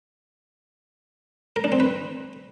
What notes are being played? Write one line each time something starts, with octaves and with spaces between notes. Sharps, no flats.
A#4
D4
C4
B4